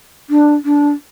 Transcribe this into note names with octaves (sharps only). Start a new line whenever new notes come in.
D4
D4